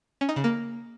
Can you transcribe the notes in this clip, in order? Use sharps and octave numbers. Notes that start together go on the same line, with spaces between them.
C#4
D#4
C#3
A#3